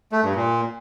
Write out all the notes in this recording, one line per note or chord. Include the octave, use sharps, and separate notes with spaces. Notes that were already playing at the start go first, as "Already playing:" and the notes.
A3
G2
A#2